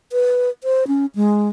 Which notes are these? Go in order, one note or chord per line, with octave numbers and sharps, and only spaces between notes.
B4
C5
C#4
G#3